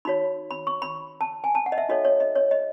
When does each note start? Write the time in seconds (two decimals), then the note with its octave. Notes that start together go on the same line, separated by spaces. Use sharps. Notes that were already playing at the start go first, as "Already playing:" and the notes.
0.05 D#4 F#4 C#5 B5
0.51 B5
0.67 C#6
0.82 B5
1.21 A5
1.44 G#5
1.55 A5
1.66 F#5
1.72 D#5
1.78 E5
1.89 D#4 F#4 A4 C#5 D#5
2.05 C#5
2.20 D#5
2.36 C#5
2.51 D#5